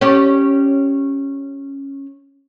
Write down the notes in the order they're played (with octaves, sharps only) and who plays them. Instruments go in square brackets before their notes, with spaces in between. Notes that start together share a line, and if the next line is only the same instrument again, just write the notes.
[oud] C#4 G4 D5